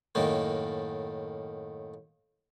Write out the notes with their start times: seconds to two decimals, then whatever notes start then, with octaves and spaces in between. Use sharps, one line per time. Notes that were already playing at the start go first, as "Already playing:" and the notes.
0.15 F#2 A2 D#3 A#3